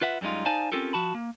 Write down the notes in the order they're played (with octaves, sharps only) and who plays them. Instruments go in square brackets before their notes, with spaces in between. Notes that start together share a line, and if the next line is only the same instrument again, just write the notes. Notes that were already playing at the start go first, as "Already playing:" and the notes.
[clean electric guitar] F4 B4 E5 F#5
F#2 G3 G#3 D#4 F4
D#4 C5 D5 F5 G#5 A5
C4 C#4 F4 G4 A4 A#4
F3 F#4 A5 B5
A#3